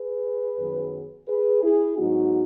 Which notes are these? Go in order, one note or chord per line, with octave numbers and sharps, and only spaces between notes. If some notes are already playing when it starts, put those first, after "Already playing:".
Already playing: G#4 B4
F#2 D#3 F#3 B3
G#4 B4
E4 G#4
G#2 F#3 B3 D#4 F#4